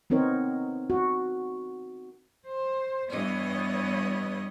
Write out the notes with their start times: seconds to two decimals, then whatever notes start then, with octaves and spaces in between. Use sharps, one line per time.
0.10 B3 C4 D#4 A#4 C#5
0.90 F#4
2.47 C5
3.11 G2 E3 B3 C#5 D#5